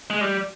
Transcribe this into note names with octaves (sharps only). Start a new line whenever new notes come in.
G#3
G3